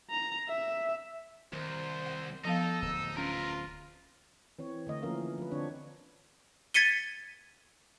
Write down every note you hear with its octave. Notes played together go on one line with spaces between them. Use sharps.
A#5
E5
C2 D#3 C5
F#5
F3 B3 D#4 A4 F5
D1 E6
C#4 F4 A#4 B4
E3 C4 C#5
D3 A3 D#5
E3 F3 A#3 C#4 A#4 F5
F3 B4
D3 C4 D4 C#5
G#6 A6 B6 C#7 D#7 G7